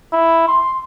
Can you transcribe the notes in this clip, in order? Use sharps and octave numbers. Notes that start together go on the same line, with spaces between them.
E4
C6